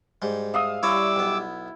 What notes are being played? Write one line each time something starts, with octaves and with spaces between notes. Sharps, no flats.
G#2 G3
E5 F5 D#6
G3 E4 C#5 D5 A#5 D6 E6
B1 B3